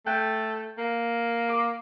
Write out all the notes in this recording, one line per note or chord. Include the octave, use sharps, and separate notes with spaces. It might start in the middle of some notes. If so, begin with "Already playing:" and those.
A3 G5 F#6
A#3
D6